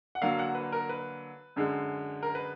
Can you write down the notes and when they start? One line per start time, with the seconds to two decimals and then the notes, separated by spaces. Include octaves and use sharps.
0.15 F#5
0.22 D3 F#3 A#3 F5
0.39 F#5
0.55 B4
0.72 A#4
0.89 B4
1.56 F#2 D3 G#3
2.23 A#4
2.35 B4